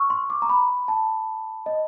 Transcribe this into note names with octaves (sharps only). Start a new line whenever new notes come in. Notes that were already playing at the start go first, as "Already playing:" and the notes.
Already playing: C#6 E6 F6
C6
D6
A#5
B5
A5
D#5